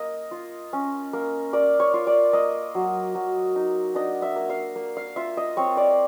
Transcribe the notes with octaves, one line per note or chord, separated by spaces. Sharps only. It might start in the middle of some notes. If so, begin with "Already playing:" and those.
Already playing: A#3 D#5
F4
C#4
A#3
A#3 D5
C#5
F4
D5
A#3 D#5
F#3
F#3
D#4
D4 D#5
E5
A#3
F5
A#3
F5
F4 E5
D#5
C4 C#5
D5